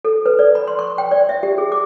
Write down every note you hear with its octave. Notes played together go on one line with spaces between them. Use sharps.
A4
B4
D5
B5
C6
C#6
G5
D5
E5
G4
G#4
D6